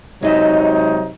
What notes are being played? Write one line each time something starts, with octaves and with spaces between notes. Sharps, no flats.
C3 F#3 G#3 D#4 D#5 E5